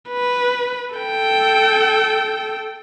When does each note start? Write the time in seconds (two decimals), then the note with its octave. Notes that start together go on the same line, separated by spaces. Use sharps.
0.10 B4
0.95 A4 G5